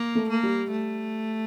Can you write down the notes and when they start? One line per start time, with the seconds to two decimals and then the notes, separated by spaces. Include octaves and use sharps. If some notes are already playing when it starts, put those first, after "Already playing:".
Already playing: A#3
0.15 A3
0.29 A#3
0.43 G3
0.71 A3